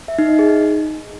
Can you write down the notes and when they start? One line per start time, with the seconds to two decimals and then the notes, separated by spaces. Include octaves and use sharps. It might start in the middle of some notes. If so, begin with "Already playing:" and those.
0.08 E5
0.19 D#4
0.29 D#5
0.39 G#4
0.49 D#4